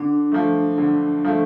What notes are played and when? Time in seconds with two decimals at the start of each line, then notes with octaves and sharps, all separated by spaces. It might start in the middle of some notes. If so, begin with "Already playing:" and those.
Already playing: D3 D4
0.32 F3 A3
0.78 D3
1.25 F3 A3